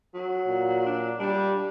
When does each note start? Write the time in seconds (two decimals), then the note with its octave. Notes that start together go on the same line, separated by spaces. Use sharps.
0.14 F#3
0.47 A#2
0.86 D4
1.19 G3 D4